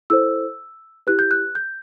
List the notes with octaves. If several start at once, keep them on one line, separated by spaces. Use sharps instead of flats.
E4 A4 C5 E6
E4 G4 B4 F#6
G6
F#6
G6